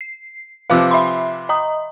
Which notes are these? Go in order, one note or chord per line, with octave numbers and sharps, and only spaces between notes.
C7
C3 F3 B4 F5 D6 E6
E5 B5 C6
D#5 A#5 D#6